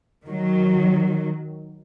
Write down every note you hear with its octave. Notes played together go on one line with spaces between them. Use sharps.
D#3 F#3